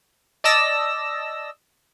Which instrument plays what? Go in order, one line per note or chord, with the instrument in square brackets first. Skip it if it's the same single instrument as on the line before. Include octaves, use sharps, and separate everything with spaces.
[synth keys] D5 D#5 A5 E6 A#6